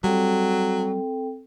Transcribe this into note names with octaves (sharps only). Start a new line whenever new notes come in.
F#3 G3 C4 A4 G5